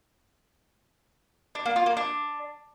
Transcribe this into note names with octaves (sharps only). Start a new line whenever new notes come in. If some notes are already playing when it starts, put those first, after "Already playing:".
D4
A#3
F4
A#3
D4